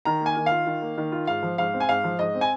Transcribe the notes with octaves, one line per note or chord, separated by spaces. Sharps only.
D#3 A#5
A#3
G#5
D#3
F4 F5
D#3
A#3
D#3
F4
G#2 F5
F3
G#2 F5
C4
G#5
G#2 F5
F3
G#2 D#5
C4
G#5